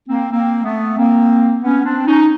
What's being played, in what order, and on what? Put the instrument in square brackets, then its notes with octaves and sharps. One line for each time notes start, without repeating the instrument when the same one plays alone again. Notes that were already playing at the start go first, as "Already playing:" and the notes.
[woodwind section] A#3 C4
A#3 C4
A3 B3
A#3 C4
B3 C#4
C4 D4
C#4 D#4